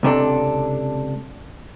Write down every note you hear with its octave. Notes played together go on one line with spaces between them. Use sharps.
C#2 C3 D4 A4